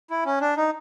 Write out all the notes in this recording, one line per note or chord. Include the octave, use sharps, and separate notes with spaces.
E4
C#4
D4
D#4